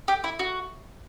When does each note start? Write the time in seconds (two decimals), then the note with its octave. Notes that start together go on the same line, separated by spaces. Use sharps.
0.08 G4
0.24 E4
0.39 F#4